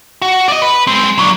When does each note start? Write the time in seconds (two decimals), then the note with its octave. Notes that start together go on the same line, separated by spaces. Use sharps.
0.22 F#4
0.48 D5 D#5
0.62 B4
0.87 G#3 C4
1.19 F#3 D4